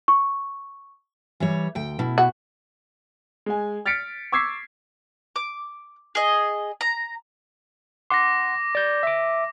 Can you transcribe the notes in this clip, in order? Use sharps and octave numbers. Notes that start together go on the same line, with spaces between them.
C#6
E3 G3 C#5
D2 G5
B2 E4
F#4
G#3 G#5
F6 A6 B6 C#7 D7
C#6 D6 E6 G#6 B6 C7
D6
G#4 D#5
A#5
F#5 C6 D6 A#6
D5 G6
E5 D6